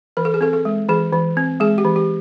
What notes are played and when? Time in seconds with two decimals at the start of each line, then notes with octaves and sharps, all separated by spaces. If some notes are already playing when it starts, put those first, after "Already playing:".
0.17 E3 A#4
0.25 A4
0.34 G#4
0.41 C4 A4
0.53 A4
0.65 G#3
0.89 E3 G#4
1.13 E3
1.37 C4
1.60 G#3 G#4
1.78 G4
1.85 E3
1.96 G4